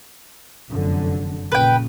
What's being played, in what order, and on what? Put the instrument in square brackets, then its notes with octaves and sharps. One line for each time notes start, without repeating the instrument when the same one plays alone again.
[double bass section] F1 F#2 D3
[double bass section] A#1 A#2 C#3 [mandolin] B4 G5